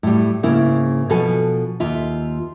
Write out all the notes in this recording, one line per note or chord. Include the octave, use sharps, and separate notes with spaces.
A2 G3
G#2 C#3 A#3 E4
B2 F3 A4 B4 G#5
D#2 F4 E5